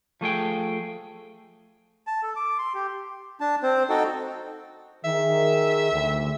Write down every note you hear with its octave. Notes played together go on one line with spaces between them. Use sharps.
F3 A3 G#4 G5
A5
A4
D6
C6
G4
D4 A5
C4 C5
D#4 F#4 A4 G5
D#3 G#4 E5
D2